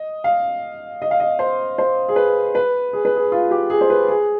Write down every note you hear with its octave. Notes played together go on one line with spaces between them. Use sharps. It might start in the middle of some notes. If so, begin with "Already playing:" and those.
Already playing: D#5
F5
D#5
F5
D#5
C5
C5
G#4
B4
B4
G#4
B4
G#4
F4
G4
G#4
C5
B4
G#4